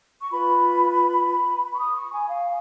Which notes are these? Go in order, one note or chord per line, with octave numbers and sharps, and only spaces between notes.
C#6
F4 B4 B5
B5
C#6
D#6
C#6
G#5
F5